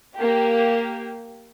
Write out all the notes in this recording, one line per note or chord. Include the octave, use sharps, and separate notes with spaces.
A#3 G4